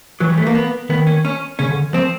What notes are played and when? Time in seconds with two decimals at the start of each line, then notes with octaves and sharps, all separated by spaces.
0.20 E3 F#3
0.30 G3
0.37 A3
0.47 A#3
0.55 B3
0.89 D#3 B3
1.07 C#4
1.25 C#4
1.59 C#3 C#4
1.70 D3
1.93 F3 C4